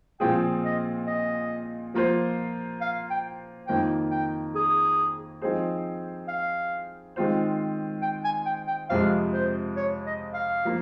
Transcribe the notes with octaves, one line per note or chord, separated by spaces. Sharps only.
A#2 F3 C4 F4 G#4 G5
D#5
D#5
F3 A#3 F4 C5
F5
G5
F2 D#3 A#3 F4 G5
G5
G#4
F3 C4 D#4 G#4 C5
F5
D#3 G#3 C4 F4 C5
G5
G#5
G5
G5
F2 C3 F3 G#3 F5
C5
C#5
D#5
F5
F3 A#3